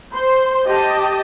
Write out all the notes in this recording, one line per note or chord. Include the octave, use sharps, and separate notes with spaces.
C5 C6
G4 D#5 A5